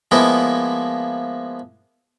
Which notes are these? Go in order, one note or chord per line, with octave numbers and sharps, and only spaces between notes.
F3 G#3 A#3 B3 E4